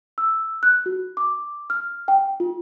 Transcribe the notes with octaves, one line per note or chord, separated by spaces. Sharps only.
E6
F#6
F#4
D6
F6
G5
F4